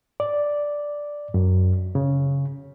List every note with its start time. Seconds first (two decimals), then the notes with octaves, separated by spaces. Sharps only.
0.20 D5
1.34 F#2
1.95 C#3